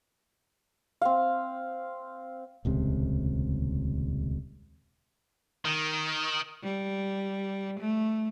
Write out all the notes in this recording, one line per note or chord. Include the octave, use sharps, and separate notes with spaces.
C4 F5
D#1 C#2 C3
D#3
G3
A3